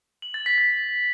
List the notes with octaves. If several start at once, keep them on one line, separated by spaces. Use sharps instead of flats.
F#7
A6
B6
A6